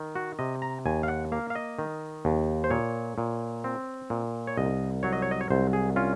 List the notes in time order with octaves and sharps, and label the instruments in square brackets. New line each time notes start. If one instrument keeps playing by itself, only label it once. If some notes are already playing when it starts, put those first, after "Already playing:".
Already playing: [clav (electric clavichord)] D#3
F#4
C3 D#5
A#5
D#2 G#5
F5
F#5
A#3 F5
F5
D#5
D#3
D#2
C5
A#2 C#5
A#2
C4
A#2
C#5
C2 D#5
F#3 C#5
D#5
C#5
D#5
C#5
C2 C5
G#4
C#4 F4